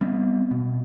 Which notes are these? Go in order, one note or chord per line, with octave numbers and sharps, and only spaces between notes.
G3 B3 C4
B2